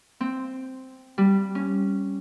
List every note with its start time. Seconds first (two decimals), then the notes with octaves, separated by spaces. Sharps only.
0.21 C4
1.18 G3
1.55 C#4